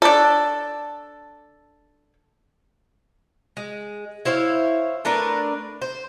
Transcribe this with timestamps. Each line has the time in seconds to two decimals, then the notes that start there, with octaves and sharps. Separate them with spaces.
0.02 D4 A4
3.57 G#3
4.25 E4 C5 C#5 F5
5.05 A3 D4 A#4 B4
5.81 C5